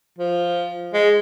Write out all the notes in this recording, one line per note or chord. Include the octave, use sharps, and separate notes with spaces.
F3
G#3